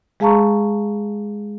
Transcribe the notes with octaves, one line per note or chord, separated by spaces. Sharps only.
G#3 G#4 F5 A5 A#5 C#6